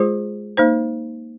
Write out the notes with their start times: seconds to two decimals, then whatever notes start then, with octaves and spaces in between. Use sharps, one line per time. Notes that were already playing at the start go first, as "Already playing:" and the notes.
Already playing: G#3 F4 G#4 C5
0.57 A#3 D#4 C5